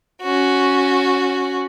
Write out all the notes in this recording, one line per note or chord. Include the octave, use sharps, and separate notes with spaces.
C#4 F#4